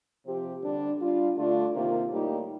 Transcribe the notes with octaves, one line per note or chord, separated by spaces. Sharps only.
C3 F3 C4 G4
D3 G3 D4
G3 D4 F4
D3 A3 D4 F4
C3 D#3 A#3 F4
A2 G3 A#3 D#4 G4